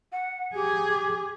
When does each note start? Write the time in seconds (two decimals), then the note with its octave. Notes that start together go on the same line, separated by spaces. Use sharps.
0.12 F#5
0.55 G4 G#4